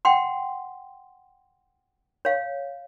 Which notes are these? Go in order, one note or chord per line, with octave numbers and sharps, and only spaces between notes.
F#5 G5 C6
C#5 F5